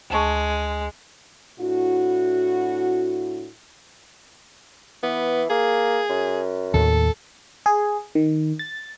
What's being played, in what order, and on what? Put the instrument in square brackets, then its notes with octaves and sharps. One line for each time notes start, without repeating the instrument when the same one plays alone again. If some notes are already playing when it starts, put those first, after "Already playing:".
[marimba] D2 A5 C#6 [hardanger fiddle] G#3
[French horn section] A2 D4 E4 F#4
[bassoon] E3 [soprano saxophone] B3
[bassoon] A#3 [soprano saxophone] G#4
[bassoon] F#2
[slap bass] D#2 A2 D#3 [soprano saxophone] A4
[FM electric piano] G#4
D#3
A6